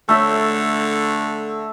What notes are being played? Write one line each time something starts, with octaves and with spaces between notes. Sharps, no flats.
D3 A3 E5